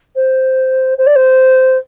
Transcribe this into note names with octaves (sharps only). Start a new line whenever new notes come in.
C5
C5
D5
C5